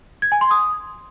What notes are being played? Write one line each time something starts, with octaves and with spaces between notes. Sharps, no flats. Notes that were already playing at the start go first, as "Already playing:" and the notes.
G#6
G#5
C6
D#6